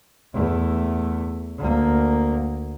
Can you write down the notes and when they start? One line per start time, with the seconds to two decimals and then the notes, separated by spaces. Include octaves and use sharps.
0.34 E2 A3
1.59 D2 A#3